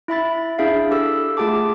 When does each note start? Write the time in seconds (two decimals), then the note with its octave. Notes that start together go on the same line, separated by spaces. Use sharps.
0.08 E4 E5 B5 A6
0.58 D4 E4 G#4 E5 F5
0.91 G4 A4 E6
1.37 A3 F4 G#4 F#5 A5 D6